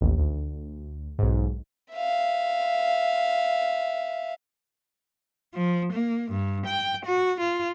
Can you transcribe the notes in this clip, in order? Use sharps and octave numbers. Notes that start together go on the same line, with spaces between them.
A1 D#2
D2
B1 G#2
E5 F5
F3
A#3
G2
G5
F#4
F4